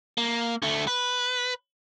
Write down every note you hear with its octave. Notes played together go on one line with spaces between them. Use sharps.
A#3
D2 A3
B4